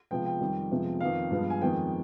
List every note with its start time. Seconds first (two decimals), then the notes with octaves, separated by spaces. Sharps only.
0.11 C3 F3 G#3 B3 G5
0.26 G5
0.41 F2 D#3 G3
0.71 F2 C3 F3 G#3 B3
1.01 F2 D#3 B3 F5
1.31 G2 F3 G#3 B3
1.50 G#5
1.61 F2 D#3 G#3 B3 G5